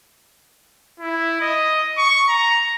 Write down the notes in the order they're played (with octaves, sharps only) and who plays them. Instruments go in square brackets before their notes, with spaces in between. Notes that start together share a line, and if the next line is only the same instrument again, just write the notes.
[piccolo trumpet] E4
D#5
C#6
A#5